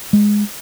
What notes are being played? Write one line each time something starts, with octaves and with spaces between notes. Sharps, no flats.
G#3